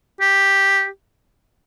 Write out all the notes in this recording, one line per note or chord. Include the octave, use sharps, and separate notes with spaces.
G4